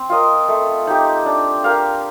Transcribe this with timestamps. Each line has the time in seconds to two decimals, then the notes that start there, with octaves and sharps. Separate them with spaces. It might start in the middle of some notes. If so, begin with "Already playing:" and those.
Already playing: C4
0.09 F4 A#4 D#5
0.48 A3
0.87 D#4 G4
1.26 D4
1.64 G4 A#4 F5